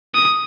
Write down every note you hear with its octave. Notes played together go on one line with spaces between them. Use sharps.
D#6